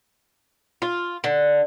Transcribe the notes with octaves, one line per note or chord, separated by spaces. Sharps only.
F4
D3